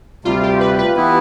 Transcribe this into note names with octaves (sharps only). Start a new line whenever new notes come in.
D2 C3 G3 F4
G4
B4
B4
E3 B3 E4